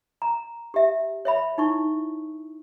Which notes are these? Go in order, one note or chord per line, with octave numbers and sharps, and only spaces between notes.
A#5
G4 E5
C#5 E5 B5
D#4 E4 C#6